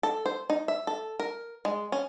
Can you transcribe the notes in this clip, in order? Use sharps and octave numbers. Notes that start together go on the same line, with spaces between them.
A4
C5
D#4
E5
A4
A#4
G#3
C#4